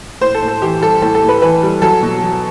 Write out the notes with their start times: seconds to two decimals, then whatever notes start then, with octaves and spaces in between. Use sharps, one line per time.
0.21 A2 C5
0.35 A4
0.42 A2
0.48 A4
0.62 E3 G4
0.82 G3 A4
1.02 A2 A4
1.15 A4
1.23 A2
1.29 B4
1.42 E3 B4
1.63 G3
1.82 F#3 A4
2.03 B2
2.23 F#3